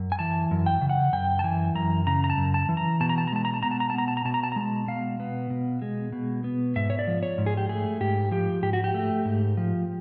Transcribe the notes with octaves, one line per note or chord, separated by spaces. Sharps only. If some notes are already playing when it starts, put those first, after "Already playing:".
Already playing: F#2
G#5
E3 A5
F#2
G5
C#3
F#5
F#2 G5
A5
E3 G#5
F#2 A#5
C#3 A#5
A#5
A5
F#2
A5
E3
A#5
B2 A5
A#5
A5
A#5
G#3 A5
A#5
A5
B2 A#5
A5
A#5
A5
B3 A#5
A5
A#5
B2 A5
A#5
A5
A#5
G#3 A5
B2 F5
B3
B2
G#3
B2
B3
G#2 E5
C#5
D5
F3
C#5
G#2
G#4
G4
A3 G#4
G#2 G4
F3 G4
G#2 G4
F#4
G4
A3
G#2
F3